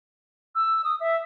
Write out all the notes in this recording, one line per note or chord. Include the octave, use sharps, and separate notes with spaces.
E6
D#6
E5